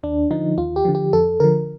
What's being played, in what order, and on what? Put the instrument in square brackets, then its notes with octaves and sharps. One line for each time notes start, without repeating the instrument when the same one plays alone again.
[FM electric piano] D#2 D4
D3 F3 D#4
D#2 F4
G4
D3 F3
G4
F2 A4
D3 F3 A#4